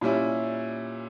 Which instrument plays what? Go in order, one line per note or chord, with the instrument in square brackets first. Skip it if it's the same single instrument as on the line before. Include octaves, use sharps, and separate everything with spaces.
[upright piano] A#2 G3 C#4 E4